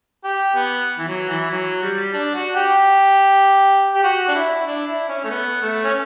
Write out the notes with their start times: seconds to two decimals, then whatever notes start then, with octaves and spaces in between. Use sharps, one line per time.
0.24 G4
0.56 B3
0.98 E3
1.08 F#3
1.29 E3
1.51 F#3
1.83 G3
2.13 D4
2.35 F#4
2.56 G4
3.95 G4
4.04 F#4
4.28 D4
4.35 E4
4.66 D4
4.87 E4
5.09 C#4
5.24 A3
5.30 B3
5.61 A3
5.84 C#4